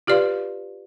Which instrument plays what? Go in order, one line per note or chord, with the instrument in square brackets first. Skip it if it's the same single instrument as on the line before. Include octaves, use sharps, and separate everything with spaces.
[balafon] F4 G4 B4 D5 F5 C6